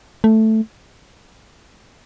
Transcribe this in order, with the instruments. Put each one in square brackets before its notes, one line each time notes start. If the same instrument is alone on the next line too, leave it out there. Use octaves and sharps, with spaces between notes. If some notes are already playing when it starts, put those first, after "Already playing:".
[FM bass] A3